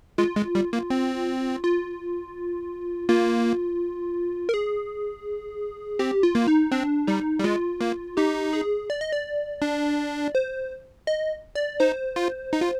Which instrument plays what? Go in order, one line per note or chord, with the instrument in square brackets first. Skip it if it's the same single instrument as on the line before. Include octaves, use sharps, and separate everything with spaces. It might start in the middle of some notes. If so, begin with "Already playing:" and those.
[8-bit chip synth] G#3 [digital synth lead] F4
[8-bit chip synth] G#3
G3
A#3
C4
[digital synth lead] F4
[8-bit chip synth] A#3 [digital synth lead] F4
[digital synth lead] A#4
G#4
[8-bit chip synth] C4 [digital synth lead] G4
[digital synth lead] F4
[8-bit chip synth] A#3
[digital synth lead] D#4
[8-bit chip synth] C4 [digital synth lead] D4
[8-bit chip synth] G3 [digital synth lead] D#4
[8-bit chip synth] G3
[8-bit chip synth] G#3 [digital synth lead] F4
[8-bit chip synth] A#3
[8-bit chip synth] D#4 [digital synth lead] G4
[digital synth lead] G#4
D5
D#5
D5
[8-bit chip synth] D4
[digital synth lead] C5
D#5
D5
[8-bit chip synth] D#4 [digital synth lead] C5
[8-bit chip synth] F4
D#4
F4